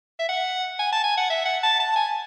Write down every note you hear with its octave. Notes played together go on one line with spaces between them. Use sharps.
E5
F#5
G#5
A5
G#5
F#5
E5
F#5
A5
A5
G#5